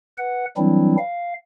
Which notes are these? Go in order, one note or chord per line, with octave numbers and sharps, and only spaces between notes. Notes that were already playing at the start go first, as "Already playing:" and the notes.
B4 F#5
E3 F#3 G3 C4 D4 E4
F5